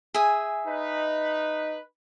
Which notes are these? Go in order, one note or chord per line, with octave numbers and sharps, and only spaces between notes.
G#4 E5 G#5
D#4 B4